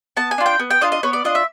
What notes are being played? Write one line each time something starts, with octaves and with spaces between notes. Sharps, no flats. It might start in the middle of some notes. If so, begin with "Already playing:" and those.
B3 A5
G#5
D4 F4
G5
B3
G5
D4 F4 D#5
D#5
B3 C#5
D5
D4 F4 D#5
E5